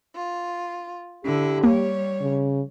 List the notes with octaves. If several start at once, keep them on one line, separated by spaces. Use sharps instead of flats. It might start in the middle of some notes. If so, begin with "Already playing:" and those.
F4
D3 E4 G4
G3 A#3 C#5
C#3